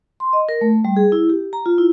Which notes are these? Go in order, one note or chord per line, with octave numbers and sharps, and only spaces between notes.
C6
D#5
A#4
A3
G3
G#4
E4
G4
A#5
F4
E4